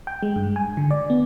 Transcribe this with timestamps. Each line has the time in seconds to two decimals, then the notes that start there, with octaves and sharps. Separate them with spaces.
0.07 G5
0.23 G#3
0.36 G2
0.56 G#5
0.77 D3
0.91 D5
1.10 B3